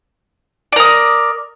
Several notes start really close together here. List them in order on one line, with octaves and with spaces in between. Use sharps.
D5 A#4 D#6